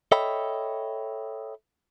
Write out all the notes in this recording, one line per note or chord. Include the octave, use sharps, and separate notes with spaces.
A4 C#5 D#5 E5 G5 B5